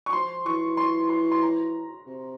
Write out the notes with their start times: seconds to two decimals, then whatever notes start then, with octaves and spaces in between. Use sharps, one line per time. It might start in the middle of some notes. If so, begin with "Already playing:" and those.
0.06 C#6
0.13 F3 C6
0.45 E3 C#6
0.77 C6
1.09 C6
1.31 C6
1.42 A#5
2.06 C3